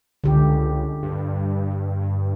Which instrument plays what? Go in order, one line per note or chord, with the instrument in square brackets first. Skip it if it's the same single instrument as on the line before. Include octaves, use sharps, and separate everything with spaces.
[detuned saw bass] C#2 [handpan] D3 G4
[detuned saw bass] G2